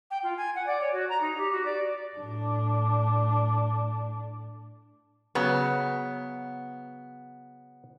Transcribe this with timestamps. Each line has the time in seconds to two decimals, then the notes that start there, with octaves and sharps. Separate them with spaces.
0.10 G5
0.23 F4
0.37 G#5
0.55 F#5
0.66 D5
0.81 C#5
0.92 F#4
1.09 A#5
1.20 D#4
1.38 G4
1.52 F#4
1.65 D5
2.18 A2 D4
5.35 C#3 F#3 B3